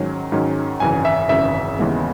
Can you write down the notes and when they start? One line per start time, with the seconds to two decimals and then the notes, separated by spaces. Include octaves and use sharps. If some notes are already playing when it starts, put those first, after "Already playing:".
Already playing: G#2 D#3 F#3 C#4
0.32 G#2 D#3 F#3 C#4
0.80 G#1 F#2 C#3 E3 G#5
1.05 E5
1.29 G#1 F#2 C#3 E3 E5
1.79 D#2 C#3 E3 G#3 B3